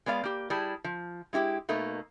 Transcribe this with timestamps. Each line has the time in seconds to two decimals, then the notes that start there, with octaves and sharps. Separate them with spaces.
0.06 G#3 B3 D5 F5
0.24 A#3 G4
0.50 G3 E4 G#4 A5
0.84 F3
1.33 G#3 E4 F#4 G4
1.69 B2 A3 A#3 D#4